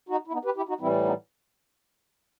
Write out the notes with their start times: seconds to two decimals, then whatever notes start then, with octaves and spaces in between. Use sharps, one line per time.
0.09 D#4 F#4
0.27 E4
0.33 B3 D#4
0.45 G4 B4
0.56 E4 G4
0.69 D#4 F#4
0.80 A2 E3 G3 C4 E4
1.04 B3 D#4